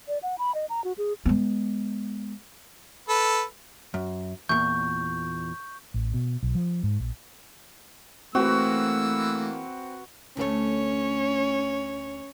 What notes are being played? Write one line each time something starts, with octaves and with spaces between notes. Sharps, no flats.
D5
F#5
B5
D#5
A#5
F#4
G#4
G#3 B3
A4 B4
F#2
E2 A#2 C#6 G6
A1
B2
B1
F3
G#2
A#1
E3 A3 A#3 C4 F#4 B4 E6
D2 A3 C#4 C#5